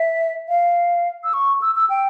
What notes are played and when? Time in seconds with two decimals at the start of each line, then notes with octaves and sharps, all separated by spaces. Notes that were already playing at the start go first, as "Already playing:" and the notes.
Already playing: E5
0.49 F5
1.24 E6
1.34 C#6
1.62 E6
1.76 E6
1.90 G5